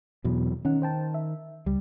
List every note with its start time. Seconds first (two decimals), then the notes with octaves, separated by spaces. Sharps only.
0.25 E2 B2 E3 F#3
0.65 D#3 C#4 F#5
0.82 C5 G5 A5
1.14 E5
1.66 C#2 G3